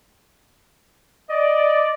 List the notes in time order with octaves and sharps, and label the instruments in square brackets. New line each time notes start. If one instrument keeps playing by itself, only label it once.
[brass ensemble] D5 [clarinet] D#5